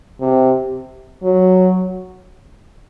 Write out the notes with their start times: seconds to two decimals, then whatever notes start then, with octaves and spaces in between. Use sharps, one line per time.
0.21 C3
1.23 F#3